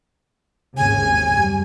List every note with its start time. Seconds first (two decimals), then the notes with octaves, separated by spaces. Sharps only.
0.77 G#1 D#2 C#3 G#5
1.30 F#2 G3